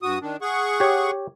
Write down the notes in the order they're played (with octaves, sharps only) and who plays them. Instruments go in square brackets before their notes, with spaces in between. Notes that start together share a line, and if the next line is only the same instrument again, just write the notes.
[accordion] G2 F#4 D#6
D#3 D4
G#4 F#5 C#6
[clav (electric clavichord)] G4 C#5